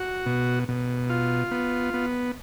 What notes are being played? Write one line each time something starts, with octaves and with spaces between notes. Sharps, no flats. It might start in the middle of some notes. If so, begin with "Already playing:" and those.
Already playing: F#4
B2
B2
F4
B3
B3